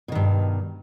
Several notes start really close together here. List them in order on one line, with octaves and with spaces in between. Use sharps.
B2 D#3 G2